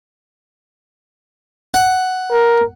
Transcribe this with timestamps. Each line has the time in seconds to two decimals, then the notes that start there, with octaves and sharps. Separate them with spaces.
1.74 F#5
2.31 A#4